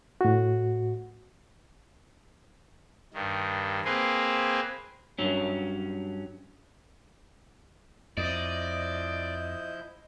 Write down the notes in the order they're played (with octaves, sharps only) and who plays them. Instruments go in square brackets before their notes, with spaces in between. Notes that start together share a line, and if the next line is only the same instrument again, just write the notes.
[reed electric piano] A2 F#4
[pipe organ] G2 D#3
A#3 C4 G#4 B4 C5
[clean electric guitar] G2 F#3 C#4
[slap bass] F2 [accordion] F3 E4 G6 [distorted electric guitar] D5 [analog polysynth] D#5